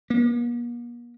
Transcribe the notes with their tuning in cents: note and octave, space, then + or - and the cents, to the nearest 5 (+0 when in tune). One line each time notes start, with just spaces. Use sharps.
A#3 +45